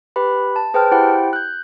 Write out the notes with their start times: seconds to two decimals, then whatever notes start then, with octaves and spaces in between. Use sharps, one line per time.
0.16 G4 B4 B5
0.56 A5
0.74 G#4 B4 C5 G5 A5 F6
0.92 E4 G4 C5 F#5 G5
1.33 F#6 G6